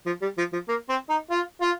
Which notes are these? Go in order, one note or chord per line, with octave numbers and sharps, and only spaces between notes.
F3
G3
F3
F3
A#3
C4
D#4
F4
F4